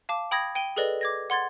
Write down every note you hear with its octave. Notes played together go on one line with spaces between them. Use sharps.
F5 A5 D6
G5 B5 D#6 G#6 A#6
G5 D#7 G7
G#4 A4 B4 D5 D#5
D6 G#6 A#6
F#5 C6 G#6 A6